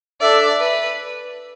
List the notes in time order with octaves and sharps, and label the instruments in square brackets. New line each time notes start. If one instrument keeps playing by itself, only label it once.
[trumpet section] D4 A4 E5 [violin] D5
[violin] B4